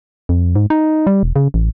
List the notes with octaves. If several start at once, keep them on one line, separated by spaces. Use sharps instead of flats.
F2
G#2
D#4
G3
E1
C#3
A1